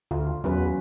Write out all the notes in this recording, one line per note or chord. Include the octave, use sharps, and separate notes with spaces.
D2 F4
E2 F#3 C#4 B4